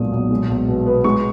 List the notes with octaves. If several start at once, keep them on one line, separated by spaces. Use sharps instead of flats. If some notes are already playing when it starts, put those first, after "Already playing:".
Already playing: B1 A#2 G#3 D#6
B1
G#3
B1
B2
B3
G#3 C#6